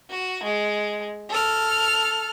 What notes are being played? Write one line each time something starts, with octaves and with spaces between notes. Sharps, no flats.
F#4
G#3
A4 F6